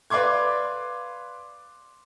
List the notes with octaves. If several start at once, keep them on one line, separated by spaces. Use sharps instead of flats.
B4 D5 F5 C6 D6 G#6